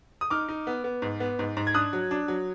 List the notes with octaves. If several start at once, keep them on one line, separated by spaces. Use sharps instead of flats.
D#6
D#4 D6 F6
D#4
B3
B3
G#2
B3
G#2
G#2
G#6
D4 D#6 F#6
F#3
D4
F#3